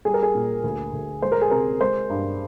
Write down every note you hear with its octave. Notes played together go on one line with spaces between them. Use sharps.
G3 G#4
A#4
G#4
A#2
D2
D2
G#3 C5
A#4
G#4
C3 A#4
G#3 C5
G2